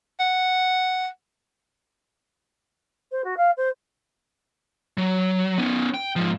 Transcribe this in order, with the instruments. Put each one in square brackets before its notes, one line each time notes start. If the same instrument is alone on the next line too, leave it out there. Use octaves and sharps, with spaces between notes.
[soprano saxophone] F#5
[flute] C5
F#4
F5
C5
[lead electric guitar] F#3
B3 C#4
G5
G#2 F3